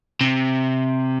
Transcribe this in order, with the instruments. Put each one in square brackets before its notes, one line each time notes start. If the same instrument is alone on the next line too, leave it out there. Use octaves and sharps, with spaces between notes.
[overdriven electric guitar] C3